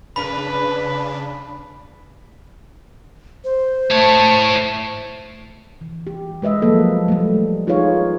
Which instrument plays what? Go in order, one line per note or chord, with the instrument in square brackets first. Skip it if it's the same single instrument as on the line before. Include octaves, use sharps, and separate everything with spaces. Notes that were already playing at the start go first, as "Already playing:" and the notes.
[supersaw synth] C#3 D4 [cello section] B4 [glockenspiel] B5
[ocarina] C5
[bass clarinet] A3 [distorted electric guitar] E4 C#5 [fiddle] A5
[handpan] E3
G4
G#3 B4 D#5 E5
F3 F#3 A#3 A4
G3 A3
D#4 F4 G#4 B4 C#5 F5